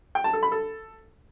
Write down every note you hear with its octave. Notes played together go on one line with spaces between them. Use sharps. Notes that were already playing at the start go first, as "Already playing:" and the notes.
G5
A5
A4
B5
A4